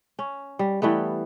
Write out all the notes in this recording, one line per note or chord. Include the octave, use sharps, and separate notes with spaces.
C#4
G3
E3 G3 A3 B3